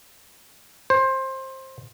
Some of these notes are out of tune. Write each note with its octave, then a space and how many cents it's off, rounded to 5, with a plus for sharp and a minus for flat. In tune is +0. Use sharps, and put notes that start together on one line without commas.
C5 +20